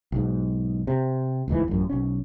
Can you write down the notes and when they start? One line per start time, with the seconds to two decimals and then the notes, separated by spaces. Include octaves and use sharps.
0.12 B1 G#2
0.87 C3
1.48 D#1 D2 G#2 E3
1.68 A1 F#2
1.90 B1 C#4